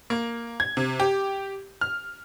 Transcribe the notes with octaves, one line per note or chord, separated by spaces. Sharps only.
A#3
G#6
C3
G4
F6